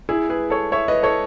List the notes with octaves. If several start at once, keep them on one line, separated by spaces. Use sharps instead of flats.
E4 G#4
G#4 B4
A4 C#5
C#5 E5
B4 D#5
A4 C#5